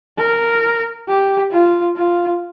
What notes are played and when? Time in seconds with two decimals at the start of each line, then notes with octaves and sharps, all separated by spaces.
0.18 A#4
1.08 G4
1.52 F4
1.96 F4